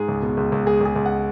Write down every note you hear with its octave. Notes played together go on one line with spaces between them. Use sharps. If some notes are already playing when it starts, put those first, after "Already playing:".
Already playing: G#2 G#4
C#2
B2
C#2
C#2
G#3 G#4
C#2 G#4
C#2
F#5